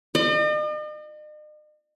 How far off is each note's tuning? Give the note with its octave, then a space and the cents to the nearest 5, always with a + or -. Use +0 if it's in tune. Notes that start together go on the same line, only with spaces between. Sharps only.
D#5 -45